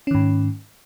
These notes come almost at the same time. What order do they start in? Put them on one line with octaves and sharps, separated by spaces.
C#4 D#3 G#2